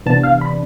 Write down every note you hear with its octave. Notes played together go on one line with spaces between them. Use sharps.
C3 E3 B3 D4 A5
F5
B5